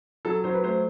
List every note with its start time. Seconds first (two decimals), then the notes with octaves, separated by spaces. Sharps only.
0.25 F#3 A4
0.44 F#3 C5
0.54 B4
0.63 A3 C5